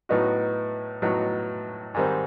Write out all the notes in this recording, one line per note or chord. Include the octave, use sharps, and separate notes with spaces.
A2 F#3 B3 D#4 F#4
A2 F#3 B3 D#4 F#4
G#2 D#3 G3 C4